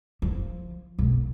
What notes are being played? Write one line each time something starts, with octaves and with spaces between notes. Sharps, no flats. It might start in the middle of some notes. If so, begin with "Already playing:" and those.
F3
B1